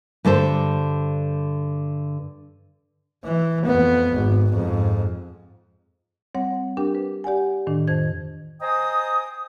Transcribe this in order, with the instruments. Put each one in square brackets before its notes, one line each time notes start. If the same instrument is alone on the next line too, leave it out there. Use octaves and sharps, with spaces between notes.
[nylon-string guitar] G2 D3 A4 C5
[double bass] E3
F2 B3
G#1
F2 G#2
[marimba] G3 C4 C#5 F#5
D4 G4 A#4 G5 D6
B4
G4 D5 F#5 G#5
A2 D#3 D4
F2 D#3 C5 G#6
[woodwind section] C5 D#5 G5 G#5 A#5 D#6